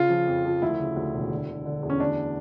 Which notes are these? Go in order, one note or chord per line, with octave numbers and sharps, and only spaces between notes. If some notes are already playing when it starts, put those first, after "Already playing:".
Already playing: C#3 F4
F3
F2
F3
D2 E4
C#3
D2
E1
D3
D3
D3
E2
C#4
D2 D4